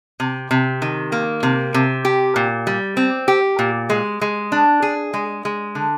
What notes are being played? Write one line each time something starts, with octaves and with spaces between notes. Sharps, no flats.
C3
C3
D#3
A#3
C3
C3
G4
A#2
G3
C4
G4
A#2
G#3
G#3
D4
G#4
G#3
G#3
D3